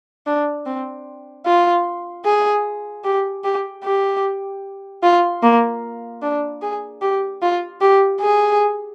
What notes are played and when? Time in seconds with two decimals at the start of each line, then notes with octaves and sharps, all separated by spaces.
0.27 D4
0.66 C4
1.46 F4
2.26 G#4
3.04 G4
3.44 G4
3.84 G4
5.03 F4
5.43 A#3
6.22 D4
6.62 G#4
7.02 G4
7.42 F4
7.81 G4
8.21 G#4